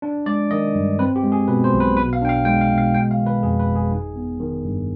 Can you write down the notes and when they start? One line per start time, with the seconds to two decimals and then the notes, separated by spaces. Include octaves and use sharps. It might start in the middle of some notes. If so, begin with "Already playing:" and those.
0.02 D4
0.26 G#3 D5
0.51 D#3 D#5
0.75 G2
0.99 C4 B4
1.16 G4
1.23 G#3
1.32 G#4
1.48 B2 B4
1.64 C5
1.73 B1
1.80 B4
1.97 B2 B4
2.13 F5
2.21 D4 G5
2.29 F5
2.45 G#3 G5
2.61 F5
2.70 B2
2.78 F5
2.94 G#3 G5
3.11 F5
3.18 D#3
3.26 B4
3.43 F2 G#4
3.59 B4
3.67 G1
3.75 G#4
3.92 D#4
4.16 B3
4.40 D#3
4.64 G2